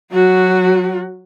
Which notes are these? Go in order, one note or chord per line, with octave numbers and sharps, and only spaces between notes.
F#3 F#4